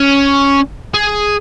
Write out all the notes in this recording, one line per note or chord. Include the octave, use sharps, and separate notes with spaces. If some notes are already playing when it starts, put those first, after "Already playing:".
Already playing: C#4
G#4